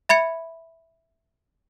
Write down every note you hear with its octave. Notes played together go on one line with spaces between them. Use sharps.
E5 B5 G#6 C#7